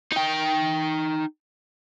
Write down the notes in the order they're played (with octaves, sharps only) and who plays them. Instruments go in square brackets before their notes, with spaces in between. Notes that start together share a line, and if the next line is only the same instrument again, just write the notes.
[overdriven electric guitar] D#4 G5